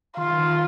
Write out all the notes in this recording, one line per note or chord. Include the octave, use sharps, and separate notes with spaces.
D#3 F4
D#3